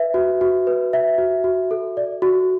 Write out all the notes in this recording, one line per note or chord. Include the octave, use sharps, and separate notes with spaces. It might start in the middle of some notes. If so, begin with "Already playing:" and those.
Already playing: B4 E5
F#4
F#4
B4
E5
F#4
F#4
A4
D5
F#4